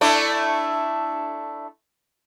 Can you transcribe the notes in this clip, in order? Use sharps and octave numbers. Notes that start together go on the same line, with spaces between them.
A3 D4 E4